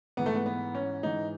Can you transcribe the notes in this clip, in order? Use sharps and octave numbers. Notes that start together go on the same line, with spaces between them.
G#2 E3 B3
A3
B3
B3
C#4
G#2 E3 D#4